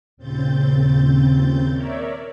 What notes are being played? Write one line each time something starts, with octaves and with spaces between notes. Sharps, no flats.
D#2 A#2 C#3 C4 G6 A6
A#4 C#5 D5 E5